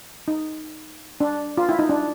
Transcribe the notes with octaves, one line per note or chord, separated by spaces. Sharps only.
D#4
D4
F4
E4
D#4
D4